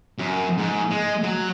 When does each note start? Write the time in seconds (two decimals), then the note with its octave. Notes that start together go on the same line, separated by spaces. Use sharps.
0.18 F#2
0.58 G#2
0.91 G#3
1.23 F#3